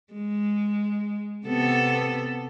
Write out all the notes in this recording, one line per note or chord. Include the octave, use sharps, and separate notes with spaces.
G#3
C3 B3 A4